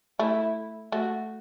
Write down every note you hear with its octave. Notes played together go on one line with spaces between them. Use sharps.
A3 E4
A3 F#4